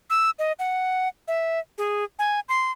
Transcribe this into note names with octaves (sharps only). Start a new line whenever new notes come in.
E6
D#5
F#5
E5
G#4
G#5
C6